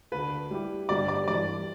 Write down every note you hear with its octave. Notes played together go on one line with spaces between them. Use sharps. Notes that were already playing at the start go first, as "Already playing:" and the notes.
D2 D3 A3 B4
G3 E4 G4
G2 D3 G3 B3 G4 D5
D5
G2 E3 G3 D5